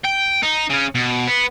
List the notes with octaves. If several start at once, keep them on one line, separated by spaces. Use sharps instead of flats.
G5
D#4
C#3 C#4
B2
B3